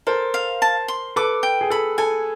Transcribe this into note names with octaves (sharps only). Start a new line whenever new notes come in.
A4 A#4 C5
F5
A5
C6
A4 B4 D6
G5
G#4
A4 B5
A4 G#5